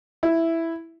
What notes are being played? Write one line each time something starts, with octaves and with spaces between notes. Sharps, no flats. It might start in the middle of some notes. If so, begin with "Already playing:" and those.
E4